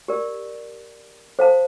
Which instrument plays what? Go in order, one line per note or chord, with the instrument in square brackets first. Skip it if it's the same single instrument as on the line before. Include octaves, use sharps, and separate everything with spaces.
[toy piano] G4 A#4 D5
A4 C5 F5 A5